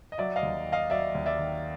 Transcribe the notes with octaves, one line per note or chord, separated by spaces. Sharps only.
D#5
F#3 D5 E5
D#5 F5
D#2
D#3
D#5 F5
F#3 D5 E5
D#2
D5 E5
D#3